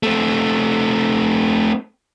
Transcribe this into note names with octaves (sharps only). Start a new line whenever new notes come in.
A3 C4